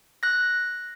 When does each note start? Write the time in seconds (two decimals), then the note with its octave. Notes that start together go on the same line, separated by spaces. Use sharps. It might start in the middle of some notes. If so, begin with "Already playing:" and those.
0.23 F#6 A#6